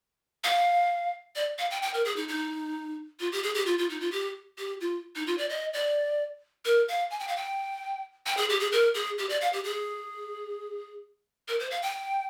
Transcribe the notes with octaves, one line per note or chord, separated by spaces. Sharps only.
F5
D5
F5
G5
G5
A#4
G#4
D#4
D#4
F4
G4
G#4
G4
F4
F4
D#4
F4
G4
G4
F4
D#4
F4
D5
D#5
D5
A#4
F5
G#5
G5
F5
G5
G5
G#4
G4
G#4
A#4
G#4
G4
D5
F5
G4
G#4
A#4
C5
F5
G5